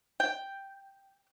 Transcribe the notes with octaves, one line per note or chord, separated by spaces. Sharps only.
G5